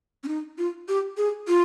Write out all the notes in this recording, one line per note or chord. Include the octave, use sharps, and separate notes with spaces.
C#4
D#4
F4
G4
G#4
F4